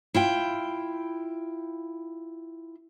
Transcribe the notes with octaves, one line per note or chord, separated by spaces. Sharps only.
E4 F4 G5